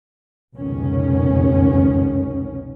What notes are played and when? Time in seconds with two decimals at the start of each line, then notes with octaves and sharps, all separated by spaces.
0.54 F1 C#2 F#2 B2 D#3 C#4